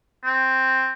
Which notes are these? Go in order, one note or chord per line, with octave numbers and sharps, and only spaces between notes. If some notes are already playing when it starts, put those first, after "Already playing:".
C4